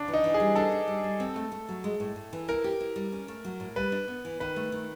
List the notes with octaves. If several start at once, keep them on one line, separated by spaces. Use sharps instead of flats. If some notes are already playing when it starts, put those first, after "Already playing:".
Already playing: C#3 D4
E3
D#4
E3
G#4
G3
D4 A4
D4
G3
G3
C4
A3
A3
F#3
G#3
A2
A2
E3
E4 A#4
G4
E4
G3
C#4
A3
F#3
A2
G3 B4
D4
B3
E3
D#3 B4
A3
D#3